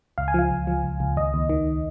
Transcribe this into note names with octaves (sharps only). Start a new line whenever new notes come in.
C#2 F5
G#5
F3 F5
C#2
F3
C#2
C#2
D#2 D#5
D#2
D#3